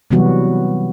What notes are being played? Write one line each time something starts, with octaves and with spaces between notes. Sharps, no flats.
C3 E3 F#3 G3 B3 F#4